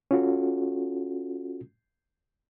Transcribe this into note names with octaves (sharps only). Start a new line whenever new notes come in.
C#4 F4 F#4 A4